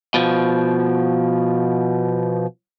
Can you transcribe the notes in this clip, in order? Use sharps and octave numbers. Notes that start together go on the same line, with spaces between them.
B2 F3